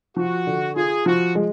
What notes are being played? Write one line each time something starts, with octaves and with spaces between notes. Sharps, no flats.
F3 F#4
D3
F4 G#4
F3 F#4
G#3